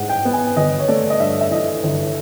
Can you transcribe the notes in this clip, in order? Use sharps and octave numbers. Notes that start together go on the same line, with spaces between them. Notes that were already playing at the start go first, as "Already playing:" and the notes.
Already playing: G#2 E3 G#3 F#5
G5
B3
G#5
G1 D#5
C#5
A3 D5
D#5
G2 E5
E5
E3 D#5
G1